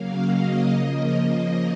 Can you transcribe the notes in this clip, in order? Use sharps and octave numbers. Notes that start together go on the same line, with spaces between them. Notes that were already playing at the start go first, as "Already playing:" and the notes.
Already playing: C#3 F#3 A#3 F5
D#5
C#3 F3 A#3